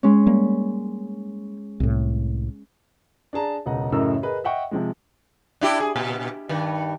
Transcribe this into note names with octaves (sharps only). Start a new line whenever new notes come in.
G#3 C#4
G3 A#3
C2 A2
D4 G#4 A5 A#5
E1 C#2 D#5 F#5
F#2 A2 C#3 A#4 D#5 E6
G#4 A#4 B4 D#5
D#5 E5 F#5 G5 C#6
C3 F3 G#3
D4 E4 G4
G#4
A#2
G2 D#3